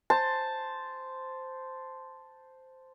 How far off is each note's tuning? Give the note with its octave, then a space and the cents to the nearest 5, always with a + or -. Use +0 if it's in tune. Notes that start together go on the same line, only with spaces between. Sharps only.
C5 -5 A5 +0